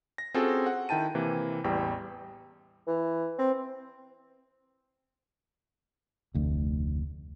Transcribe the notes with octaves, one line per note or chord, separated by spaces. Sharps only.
A#6
C4 C#4 F4 F#4 G#4 A4
F#5
D#3 E4 G5 A5 D#7
C3 E3 A#3
A1 E2 G3 G5
E3
C4
F1 D2